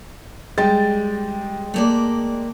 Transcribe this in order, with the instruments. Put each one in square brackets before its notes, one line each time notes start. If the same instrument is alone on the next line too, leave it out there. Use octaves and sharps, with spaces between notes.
[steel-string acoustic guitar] G3 [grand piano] G#3 G5 A6
[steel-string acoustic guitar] A3 A#3 D5